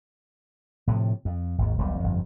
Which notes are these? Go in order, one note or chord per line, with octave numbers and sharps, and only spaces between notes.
A2 C3 E3 F3
F2
G#1 D#2
D#1 B1 B2 G3
G1 F2